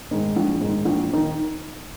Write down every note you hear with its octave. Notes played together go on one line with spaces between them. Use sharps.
G#2 D#3
A#1
G#2 D#3
A#1
D#3